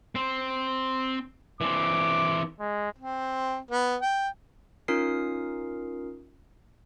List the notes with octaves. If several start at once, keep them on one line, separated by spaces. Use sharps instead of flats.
C4
E3 C4 D6
G#3
C4
B3
G5
C#4 D#4 F4 A#4 D#6 C7